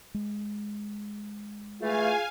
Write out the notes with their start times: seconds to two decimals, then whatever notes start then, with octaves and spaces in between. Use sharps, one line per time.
0.14 G#3
1.81 E3 A3 F4 G#4 F5 G#5